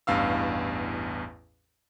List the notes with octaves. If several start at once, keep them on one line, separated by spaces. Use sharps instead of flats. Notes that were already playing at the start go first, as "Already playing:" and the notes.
A1 E2 G2 F5 E6